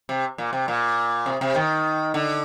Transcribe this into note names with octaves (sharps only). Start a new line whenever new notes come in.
C3
A#2
C3
A#2
C3
C3
D#3
D3